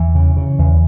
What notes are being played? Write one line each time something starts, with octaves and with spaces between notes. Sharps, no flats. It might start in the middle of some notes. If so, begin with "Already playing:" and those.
Already playing: E2 E3
C#3
C#3
E2